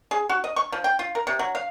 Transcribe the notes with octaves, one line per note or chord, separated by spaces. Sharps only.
G#4
F#4
D#5
C#6
F3
G5
F4
A#4
C3
F#3
F5